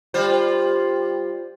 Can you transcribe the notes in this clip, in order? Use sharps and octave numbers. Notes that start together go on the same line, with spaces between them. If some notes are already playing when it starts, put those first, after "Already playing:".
G3 F4 C5